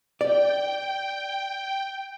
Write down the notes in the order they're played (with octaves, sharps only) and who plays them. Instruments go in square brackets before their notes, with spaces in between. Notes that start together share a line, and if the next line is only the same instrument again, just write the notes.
[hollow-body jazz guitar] D5 [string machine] G5